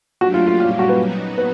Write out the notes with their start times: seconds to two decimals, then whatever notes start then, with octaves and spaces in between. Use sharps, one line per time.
0.21 F#3 A3 D4 F#4 G4
0.34 F4
0.47 F4
0.60 A#2 G3 A#3 C#4 F4
0.70 F4
0.79 F#4
0.89 B4
0.99 F#3 B3 D#4 F#4
1.38 B4